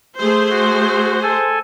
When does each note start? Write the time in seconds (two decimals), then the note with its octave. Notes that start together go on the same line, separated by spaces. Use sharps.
0.18 A3 G#4 C5
0.50 F#4
1.23 A4 G#5